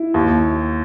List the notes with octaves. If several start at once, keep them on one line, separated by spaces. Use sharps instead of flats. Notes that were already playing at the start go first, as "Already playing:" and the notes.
Already playing: E4
D#2